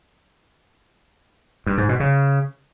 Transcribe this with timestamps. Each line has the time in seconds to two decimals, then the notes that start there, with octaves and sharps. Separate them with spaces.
1.66 G2
1.78 G#2
1.89 B2
2.00 C#3